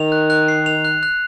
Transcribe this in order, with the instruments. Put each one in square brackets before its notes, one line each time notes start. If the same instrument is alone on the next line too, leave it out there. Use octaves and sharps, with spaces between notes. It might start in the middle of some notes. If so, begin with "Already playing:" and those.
Already playing: [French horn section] D#3 [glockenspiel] F7
[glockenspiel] F#6
F#6
C7
F7
F#6
F#6